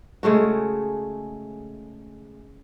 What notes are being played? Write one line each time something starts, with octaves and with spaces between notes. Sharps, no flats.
C#3 G#3 A3 F#4